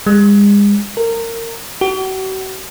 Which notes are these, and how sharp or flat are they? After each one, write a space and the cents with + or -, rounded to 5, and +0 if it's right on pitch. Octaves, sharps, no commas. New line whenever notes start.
G#3 -35
A#4 -25
F#4 +45